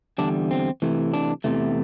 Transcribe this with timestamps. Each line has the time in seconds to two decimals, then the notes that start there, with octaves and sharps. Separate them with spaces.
0.18 E2 D3 G3 D4
0.51 C4
0.82 C3 E3 A3
1.14 D4
1.44 E2 C3 E3 A3